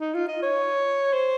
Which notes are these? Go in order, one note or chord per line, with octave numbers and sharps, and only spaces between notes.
D#4
F4
D#5
C#5
C5